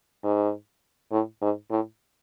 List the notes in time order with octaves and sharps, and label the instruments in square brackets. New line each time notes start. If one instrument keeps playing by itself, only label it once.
[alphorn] G#2
A2
G#2
A2